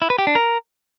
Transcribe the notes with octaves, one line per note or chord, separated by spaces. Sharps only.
E4
B4
G4
D4
A#4